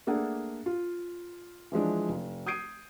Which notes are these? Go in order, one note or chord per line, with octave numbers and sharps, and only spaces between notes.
A3 A#3 D4 G#4 A4 F#5
F4
E3 F3 G#3 D4
F1
D#6 G6 G#6 C7 D7 D#7